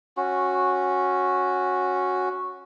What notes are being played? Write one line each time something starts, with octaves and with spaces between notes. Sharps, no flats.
C#4 F#4